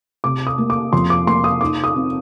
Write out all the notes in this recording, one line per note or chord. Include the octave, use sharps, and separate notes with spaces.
C3 D6
D#6
A#3
D6
F2 C6
D6
A#3 C6
D#6
D#4 D6
D#6
C4